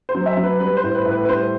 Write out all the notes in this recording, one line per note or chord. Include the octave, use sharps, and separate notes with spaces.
C5
F#3
E5
F#3
B4
G3 B4
C5
A2
B4
A2
B4
B4
G3 C5